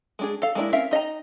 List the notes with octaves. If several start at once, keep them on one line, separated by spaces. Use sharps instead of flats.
G#3 D4 G#4
A4 F5
G#3 A#3 D4 E4
C4 C#4 A#4 E5 F5
D#4 D#5 F#5 A#5